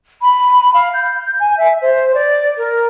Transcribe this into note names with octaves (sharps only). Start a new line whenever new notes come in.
B5
F5
G6
G#5
E5
C5
D5
A#4